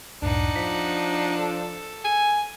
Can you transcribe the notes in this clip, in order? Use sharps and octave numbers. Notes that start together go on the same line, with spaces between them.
C#2 F#2 A2 D4 D#4 F#5
F3 B6
A4
G#5